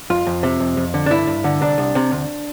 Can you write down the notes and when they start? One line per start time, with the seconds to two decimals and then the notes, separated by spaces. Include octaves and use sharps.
0.10 F2 F4
0.27 F2
0.43 C3
0.60 F2
0.77 F2
0.94 D3
1.06 D4
1.10 G2 E4
1.27 G2
1.44 D3
1.62 C2 D4
1.78 C2
1.95 C3
2.12 D2